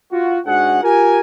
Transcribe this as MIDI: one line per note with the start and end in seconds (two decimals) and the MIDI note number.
0.12 0.39 65
0.12 0.39 66
0.46 0.80 44
0.46 0.80 62
0.46 0.80 66
0.46 0.80 68
0.46 0.80 78
0.83 1.21 65
0.83 1.21 67
0.83 1.21 70
0.83 1.21 80